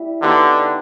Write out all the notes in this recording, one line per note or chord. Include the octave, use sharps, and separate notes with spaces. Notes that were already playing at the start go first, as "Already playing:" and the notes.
Already playing: G3 E4
D3 B3 D#4 G4 B4